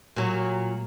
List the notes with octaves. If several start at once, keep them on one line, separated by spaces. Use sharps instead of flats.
A#2 F#3